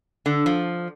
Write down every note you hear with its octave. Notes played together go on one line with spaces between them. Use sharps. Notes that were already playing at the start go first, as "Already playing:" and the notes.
D3
F3